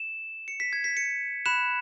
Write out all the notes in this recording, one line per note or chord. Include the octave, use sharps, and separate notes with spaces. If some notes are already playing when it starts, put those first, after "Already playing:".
Already playing: E7
C#7
B6
G#6
B6
C#7
B5 F#6 E7